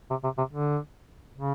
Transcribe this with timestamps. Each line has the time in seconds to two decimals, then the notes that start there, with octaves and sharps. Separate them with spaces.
0.10 C3
0.24 C3
0.38 C3
0.52 D3
1.37 C#3